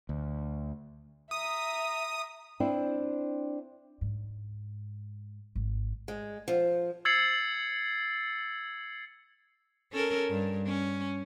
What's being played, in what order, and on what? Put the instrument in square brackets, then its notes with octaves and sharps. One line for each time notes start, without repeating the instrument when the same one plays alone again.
[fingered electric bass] D2
[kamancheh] E5 A#5 [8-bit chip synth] D#6
[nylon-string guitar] C4 D4 E4 C5
[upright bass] G#2
G#1
[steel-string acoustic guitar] G#3
F3
[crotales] E6 G#6 A6 C7 C#7 F#7
[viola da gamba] C#4 A4 A#4
G2
C#4